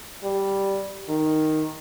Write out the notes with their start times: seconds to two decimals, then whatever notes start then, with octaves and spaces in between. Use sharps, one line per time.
0.24 G3
1.09 D#3